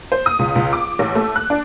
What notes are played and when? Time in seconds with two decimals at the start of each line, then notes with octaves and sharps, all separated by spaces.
0.12 C5
0.26 D#6
0.39 C#2
0.56 C#2
0.73 D6
0.99 A1
1.15 A3
1.36 F#6
1.50 D4